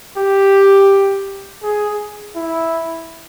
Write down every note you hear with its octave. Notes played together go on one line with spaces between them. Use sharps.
G4
G#4
E4